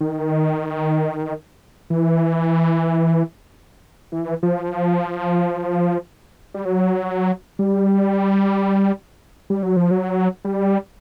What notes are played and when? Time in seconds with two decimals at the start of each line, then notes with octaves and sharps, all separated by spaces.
0.01 D#3
1.90 E3
4.12 E3
4.43 F3
6.54 G3
6.65 F#3
7.59 G3
9.50 G3
9.63 F#3
9.76 F3
9.91 F#3
10.45 G3